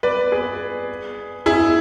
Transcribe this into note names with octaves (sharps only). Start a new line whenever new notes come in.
B4 D5
G#4 B4
E4 G#4